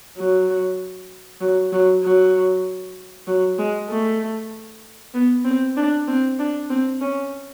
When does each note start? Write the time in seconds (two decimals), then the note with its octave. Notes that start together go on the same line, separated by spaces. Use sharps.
0.17 F#3
1.41 F#3
1.73 F#3
2.03 F#3
3.27 F#3
3.59 G#3
3.89 A3
5.14 B3
5.45 C4
5.77 D4
6.08 C4
6.39 D4
6.70 C4
7.01 C#4